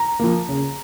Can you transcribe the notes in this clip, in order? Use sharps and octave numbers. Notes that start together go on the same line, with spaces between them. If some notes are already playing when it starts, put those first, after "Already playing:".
Already playing: A#5
F3 A#3
C#3